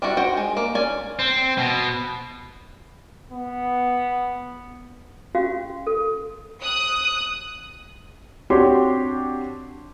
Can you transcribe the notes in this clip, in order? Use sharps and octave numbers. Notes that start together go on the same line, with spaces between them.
G3 D4 E4 F#4
F#4 C5 G5
G#3
A#3
C#4 D5 G#5
C4
B2
B3
C#4 F#4 G4 F5
A4
D#6 F#6
C4 D4 F#4 G4 C#5 C6